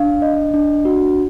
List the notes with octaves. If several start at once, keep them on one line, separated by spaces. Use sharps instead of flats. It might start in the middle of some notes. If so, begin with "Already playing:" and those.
Already playing: D4 F5
D#5
D4
F#4